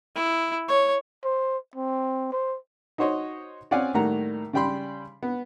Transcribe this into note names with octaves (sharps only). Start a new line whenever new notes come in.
E4
C#5
C5
C4
C5
D#4 F#4 C5 C#5 D#5
C4 C#4 D5 F5 F#5 G#5
A2 D#3 G3 A#3 F#5 A#5
C#3 G3 G5 B5 C6
B3